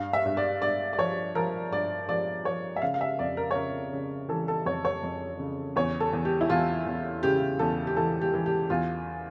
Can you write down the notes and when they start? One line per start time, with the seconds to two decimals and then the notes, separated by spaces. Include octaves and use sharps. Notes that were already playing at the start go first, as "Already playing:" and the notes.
Already playing: G2 F5
0.13 E5
0.25 G2
0.37 D5
0.62 G2 D5
0.93 D5
0.98 F3 C#5
1.35 F3 A#4
1.72 G2 D5
2.09 F3 D5
2.45 F3 C#5
2.76 E5
2.82 C#3 F5
2.94 F5
3.01 E5
3.19 F2 D5
3.37 A#4
3.51 C#5
3.55 C#3 A#4
3.93 C#3
4.29 E3 A4
4.48 A4
4.65 F2 C#5
4.85 C#5
5.03 F2
5.39 C#3
5.76 E2 C#5
6.00 A4
6.13 E2
6.25 G4
6.41 E4
6.50 E2 F4
6.86 E2
7.23 C#3 G4
7.59 E2 A4
7.87 G4
7.96 E3 A4
8.21 G4
8.34 E3
8.46 G4
8.70 E2 F4